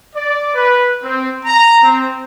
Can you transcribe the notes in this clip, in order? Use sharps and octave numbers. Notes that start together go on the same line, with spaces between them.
D5
B4
C4
A#5
C4